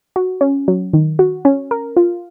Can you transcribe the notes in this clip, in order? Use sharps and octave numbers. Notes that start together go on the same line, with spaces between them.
F#4
C#4
F#3
D#3
F#4
C#4
A#4
F4